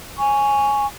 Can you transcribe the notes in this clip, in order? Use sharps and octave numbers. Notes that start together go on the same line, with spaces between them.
G#5 C#6